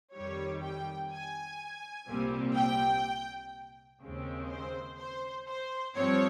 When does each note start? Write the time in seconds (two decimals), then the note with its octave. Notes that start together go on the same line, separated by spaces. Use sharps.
0.14 F2 D#3 G3 C#5
0.62 G5
1.11 G#5
2.08 C2 A#2 G3 C4
2.56 G5
4.02 D#2 C#3 G#3 C4
4.51 C5
4.99 C5
5.48 C5
5.96 G2 F3 C4 C#5